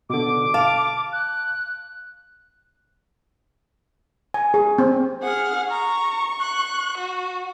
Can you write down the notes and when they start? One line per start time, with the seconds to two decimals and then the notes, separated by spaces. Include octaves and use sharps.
0.10 B2 D3 D6
0.54 F5 A5
1.13 F#6
4.34 G#5
4.54 G#4
4.78 C4
5.23 G#4 F#5 F6
5.71 A#5 C#6
6.41 F#6
6.98 F#4